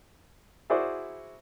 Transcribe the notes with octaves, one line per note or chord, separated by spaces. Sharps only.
E4 F#4 G#4 C5 D5 E5